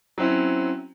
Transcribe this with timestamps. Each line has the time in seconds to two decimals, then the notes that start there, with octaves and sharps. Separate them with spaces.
0.18 F#3 C4 C#4 E4